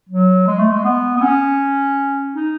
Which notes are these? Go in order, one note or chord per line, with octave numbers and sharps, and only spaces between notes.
F#3
G#3
A3
G#3
B3
B3
C#4
D#4